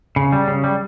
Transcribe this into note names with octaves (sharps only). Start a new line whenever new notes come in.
C#3
G3
C#3
G3